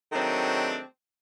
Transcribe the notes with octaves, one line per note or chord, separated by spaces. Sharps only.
D#3 F#3 G#3 A3 C4 D4